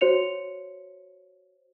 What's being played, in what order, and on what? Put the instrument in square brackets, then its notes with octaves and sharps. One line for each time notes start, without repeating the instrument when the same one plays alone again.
[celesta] F#4 C5 C#5 C#7 F7